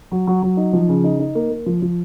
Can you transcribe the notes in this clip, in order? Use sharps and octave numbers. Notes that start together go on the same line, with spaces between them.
F#3
F#3
F#3
D#4
F3
C#3
D#4
D#4
A#3
A#3
F3
F3